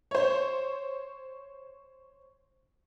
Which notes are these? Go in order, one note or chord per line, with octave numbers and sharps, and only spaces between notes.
C5 C#5